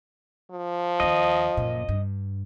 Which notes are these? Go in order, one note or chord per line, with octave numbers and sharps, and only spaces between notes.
F3
D#2 D#3 D#5
F#1 A#2
G2